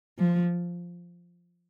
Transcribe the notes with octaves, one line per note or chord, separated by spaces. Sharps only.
F3